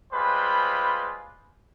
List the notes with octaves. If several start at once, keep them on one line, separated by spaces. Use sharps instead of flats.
G3 G#3 F4 B4 C5 B5